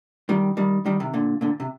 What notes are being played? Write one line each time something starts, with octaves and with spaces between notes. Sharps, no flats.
D#3 G3
D#3 G3
D#3 G3
C3 D#3
A#2 D3
A#2 D3
C3